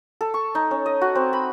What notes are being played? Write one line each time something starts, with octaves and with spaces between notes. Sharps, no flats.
A4
C#6
D#4
C#4
D#5
F#4
C4
B5